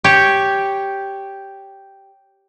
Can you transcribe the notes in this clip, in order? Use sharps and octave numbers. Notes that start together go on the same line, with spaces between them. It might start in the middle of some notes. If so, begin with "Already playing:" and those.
G4 C#5